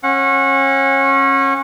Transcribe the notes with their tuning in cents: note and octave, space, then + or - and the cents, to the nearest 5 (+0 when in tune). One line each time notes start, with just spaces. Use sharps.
C#4 -30 F#5 -20